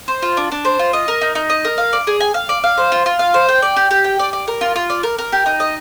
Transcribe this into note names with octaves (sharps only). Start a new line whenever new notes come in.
C5
F4
D4
D4
C5
F4
D#5
A#4
D#4
D#4
D#5
A#4
F5
D5
G#4
G#5
F5
D5
F5
C5
F4
F4
F5
C5
G5
D5
G4
G4
G5
D5
D5
A#4
F4
F4
D5
A#4
A#4
G4
D#4
D#5